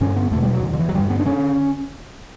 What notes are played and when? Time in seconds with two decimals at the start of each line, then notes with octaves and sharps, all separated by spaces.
0.01 G2 D3 C#4
0.16 B3
0.31 E2 A3
0.36 B2
0.42 G3
0.53 F#3
0.63 E2 D3
0.73 D3
0.79 E3
0.89 F#3
0.94 G2 D3 G3
1.10 B3
1.19 D4
1.25 D3 C#4